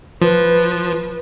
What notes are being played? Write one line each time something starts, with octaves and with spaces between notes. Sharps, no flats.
F3 B4